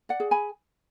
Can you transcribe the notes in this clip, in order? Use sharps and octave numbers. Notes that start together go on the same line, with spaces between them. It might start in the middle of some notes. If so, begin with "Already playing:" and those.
D5 F#5
G#4
G#5 B5